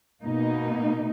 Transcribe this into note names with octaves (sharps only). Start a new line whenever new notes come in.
B2 A#3 D#4